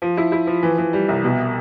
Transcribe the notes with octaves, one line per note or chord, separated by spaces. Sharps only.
F3
E4
E4
F3
E3
E3
G3
C2
B2